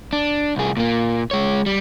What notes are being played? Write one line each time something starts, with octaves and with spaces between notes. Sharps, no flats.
D4
C2 G#4
A#2 A#3
G#3 C#5
G3